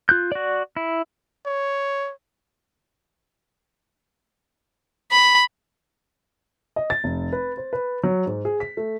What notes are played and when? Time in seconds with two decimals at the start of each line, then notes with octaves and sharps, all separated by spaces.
0.09 F4 F#6 G6
0.32 F#4 D5
0.77 E4
1.46 C#5
5.11 B5
6.76 D#5
6.90 A6
7.04 F1
7.33 B4
7.57 C5
7.73 B4
8.04 F#3
8.26 G#2
8.45 G#4
8.60 B6
8.77 A3